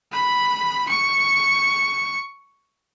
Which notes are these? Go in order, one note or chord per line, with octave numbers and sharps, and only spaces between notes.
B5
C#6